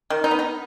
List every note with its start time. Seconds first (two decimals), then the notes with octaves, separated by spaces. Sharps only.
0.10 D#3
0.24 D#4
0.31 B3
0.39 D#4